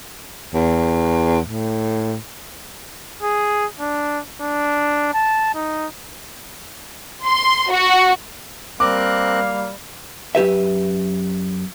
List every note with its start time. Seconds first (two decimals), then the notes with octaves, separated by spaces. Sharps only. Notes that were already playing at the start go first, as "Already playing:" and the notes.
0.54 E2
1.47 A2
3.23 G#4
3.80 D4
4.41 D4
5.14 A5
5.55 D#4
7.24 C6
7.71 F#4
8.80 G3 A#3 C4 A#4 F5 D6 F#6
10.35 F#2 G4 B4 E5